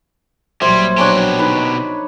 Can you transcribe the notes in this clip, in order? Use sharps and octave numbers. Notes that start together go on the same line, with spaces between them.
A#1 F#3 G3 C5 E5 G#6
B2 D4 G4 C#5 A#5
D#4 B4